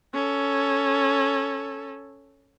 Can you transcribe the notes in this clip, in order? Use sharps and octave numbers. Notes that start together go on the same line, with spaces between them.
C#4 A4